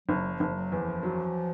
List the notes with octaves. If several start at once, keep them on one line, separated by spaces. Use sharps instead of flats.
F#1 F#3
F3
F#1
F#3
E2
F3
F#3